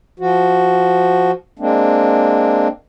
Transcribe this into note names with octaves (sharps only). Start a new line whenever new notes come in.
F3 F#4
G#3 A#3 C4 D4